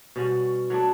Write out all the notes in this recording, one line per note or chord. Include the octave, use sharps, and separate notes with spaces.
B2 G3 C#4 F#4
F#3 A3 D4